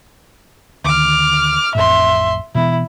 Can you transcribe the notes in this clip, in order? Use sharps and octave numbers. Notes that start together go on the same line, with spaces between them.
D2 D#3 D6 F6
A1 F2 A2 E5 C6
B2 E3 B3 E4